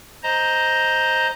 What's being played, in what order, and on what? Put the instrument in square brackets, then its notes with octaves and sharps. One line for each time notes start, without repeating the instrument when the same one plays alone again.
[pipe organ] C5 D#5 A#5